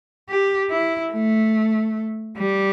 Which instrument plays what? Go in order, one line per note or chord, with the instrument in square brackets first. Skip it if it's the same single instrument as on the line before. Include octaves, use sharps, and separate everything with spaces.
[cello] G4
E4
A3
G3